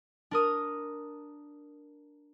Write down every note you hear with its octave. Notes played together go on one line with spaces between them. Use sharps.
D4 A#4 D#6